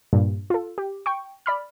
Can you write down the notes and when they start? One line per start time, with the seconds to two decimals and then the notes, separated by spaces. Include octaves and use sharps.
0.13 G2 A#2
0.50 F4 A4
0.78 G4
1.06 G5 C#6
1.46 D5 B5 F6